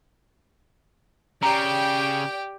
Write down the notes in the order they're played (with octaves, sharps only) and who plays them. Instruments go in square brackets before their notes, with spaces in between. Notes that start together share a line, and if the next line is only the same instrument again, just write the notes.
[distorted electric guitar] C#3 [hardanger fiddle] G4 [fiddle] D5 G5 [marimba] A#5